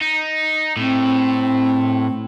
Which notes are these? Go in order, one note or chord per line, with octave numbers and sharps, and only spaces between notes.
D#4
A2 C4